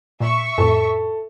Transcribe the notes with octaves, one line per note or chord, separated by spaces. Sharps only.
A#2 E5 C#6
F2 A2 A4